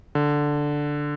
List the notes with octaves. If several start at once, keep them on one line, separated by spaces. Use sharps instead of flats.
D3